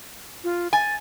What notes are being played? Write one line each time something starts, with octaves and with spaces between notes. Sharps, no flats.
F4
G#5 A6